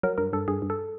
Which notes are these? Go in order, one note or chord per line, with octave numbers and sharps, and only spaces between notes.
F#3 A#4
G2 A#4
G2 A4
G2 G#4
G2
A4